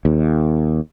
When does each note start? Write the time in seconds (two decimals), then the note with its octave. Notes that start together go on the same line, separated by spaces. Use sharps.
0.05 D#2